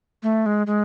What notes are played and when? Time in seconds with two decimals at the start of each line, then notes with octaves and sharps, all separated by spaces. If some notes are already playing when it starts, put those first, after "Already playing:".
0.23 A3
0.46 G#3
0.67 G#3